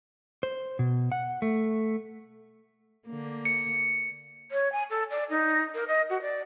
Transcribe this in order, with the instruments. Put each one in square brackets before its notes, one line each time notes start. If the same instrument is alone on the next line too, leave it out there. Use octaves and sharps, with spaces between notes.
[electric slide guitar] C5
B2
F#5
A3
[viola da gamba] D3 A#3
[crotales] C#7
[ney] C#5
G#5
A4
D5
D#4
A#4
D#5
F#4
D5